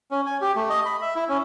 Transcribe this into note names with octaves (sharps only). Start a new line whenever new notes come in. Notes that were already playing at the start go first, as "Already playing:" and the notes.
C#4
G#5
G4
A3
D#5
B5
E5
E4
C#4